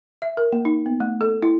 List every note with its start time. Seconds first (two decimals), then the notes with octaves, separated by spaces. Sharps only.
0.22 E5
0.37 A#4
0.53 A#3
0.65 D#4
0.86 B3
1.00 A3
1.21 A4
1.43 E4